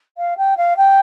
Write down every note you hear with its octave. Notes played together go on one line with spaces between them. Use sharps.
F5
G5
F5
G5